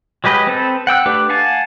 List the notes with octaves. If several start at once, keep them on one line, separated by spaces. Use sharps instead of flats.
F#3 G#3 G4 B4 D#5
C4 A4 B4
F#5 G5 E6 F#6
A3 D4 G4 B4
F5 F#5 G#5 A5